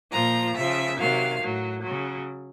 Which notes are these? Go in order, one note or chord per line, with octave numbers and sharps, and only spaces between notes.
A#2 F3 A#5
C#3 F3 E5
C3 D#3 F#3 F5
A2 F#3
C#3 F#3